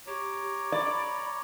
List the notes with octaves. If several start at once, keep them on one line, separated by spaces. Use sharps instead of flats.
G4 C#5 A#5 D6
D5 B5